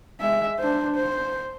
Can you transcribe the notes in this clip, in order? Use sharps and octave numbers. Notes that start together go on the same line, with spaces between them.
G#3 E5
D4 C5
C5